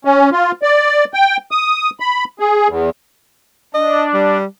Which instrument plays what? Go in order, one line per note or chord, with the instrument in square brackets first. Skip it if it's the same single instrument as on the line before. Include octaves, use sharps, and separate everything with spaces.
[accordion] C#4
F4
D5
G5
D#6
B5
G#4
E2
[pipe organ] D4 [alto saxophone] D#5
[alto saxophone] G3